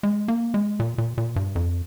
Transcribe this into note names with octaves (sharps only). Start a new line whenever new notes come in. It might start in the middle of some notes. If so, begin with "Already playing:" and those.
G#3
A#3
G#3
A#2
A#2
A#2
G2
F2